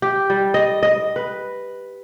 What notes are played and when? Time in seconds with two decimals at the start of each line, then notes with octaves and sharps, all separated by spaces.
0.02 G4
0.30 G3
0.54 D#5
0.83 D#5
1.16 B4